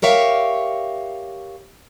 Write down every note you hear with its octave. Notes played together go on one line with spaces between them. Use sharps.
G4 A#4 C#5 E5 F5